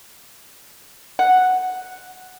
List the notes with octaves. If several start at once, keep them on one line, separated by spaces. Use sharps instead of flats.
F#5